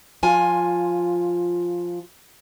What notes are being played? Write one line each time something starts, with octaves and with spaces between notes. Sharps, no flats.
F3 F4 G#5